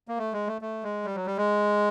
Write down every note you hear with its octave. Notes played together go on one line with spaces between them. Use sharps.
A#3
A3
G#3
A3
A3
G#3
G3
F#3
G3
G#3